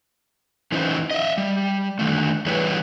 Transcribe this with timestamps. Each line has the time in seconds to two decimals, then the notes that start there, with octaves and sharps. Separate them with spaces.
0.72 E3 C#4 D#4 E4 C5
1.11 D#5 E5
1.37 G3
1.99 D3 D#3 A3
2.46 E3 G3 E4 G#4 B4 C#5